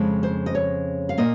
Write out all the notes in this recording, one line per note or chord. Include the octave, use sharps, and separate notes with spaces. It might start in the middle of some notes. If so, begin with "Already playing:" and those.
Already playing: F2 C#3 G#3
C5
D#5
C#5
F5
A#2 A#3 D#5